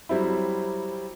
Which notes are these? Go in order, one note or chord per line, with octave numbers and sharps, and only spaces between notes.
F#3 G3 C4 E4